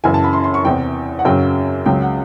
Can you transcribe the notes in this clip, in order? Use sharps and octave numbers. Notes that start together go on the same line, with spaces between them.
F#2 C#3 E3 G#5
A5
B5
C6
C6
C#6
E2 C3 E3 G5
F#5
F#2 C#3 F#3 G5
C#2 C#3 F#3 G5
F#5